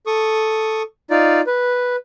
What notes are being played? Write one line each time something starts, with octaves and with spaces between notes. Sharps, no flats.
A4 C#6 D#6
D#4 F4 D5
B4